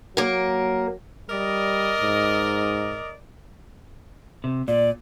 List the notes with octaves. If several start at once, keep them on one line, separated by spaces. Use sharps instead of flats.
F#3 A#3 A#4
G3 A#4 D5 D#5
G#2
C3
A#2 D5